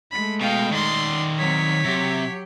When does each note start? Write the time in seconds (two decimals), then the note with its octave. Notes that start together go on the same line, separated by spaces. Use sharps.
0.12 G#3 A3 B5
0.41 B2 F5 G5
0.72 D#3 D#4 D5 C6
1.38 F#3 C4 C#5 B6
1.85 C3 F#3 G4